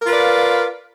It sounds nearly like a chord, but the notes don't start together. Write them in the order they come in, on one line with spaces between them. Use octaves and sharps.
A#4 F4 B4 D5 F5